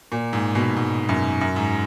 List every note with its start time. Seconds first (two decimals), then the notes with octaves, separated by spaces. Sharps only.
0.12 A#2
0.33 G#2
0.55 B2
0.76 G#2
1.09 F#2
1.41 F#2
1.56 G#2